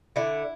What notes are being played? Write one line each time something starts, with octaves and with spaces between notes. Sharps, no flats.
D3 E4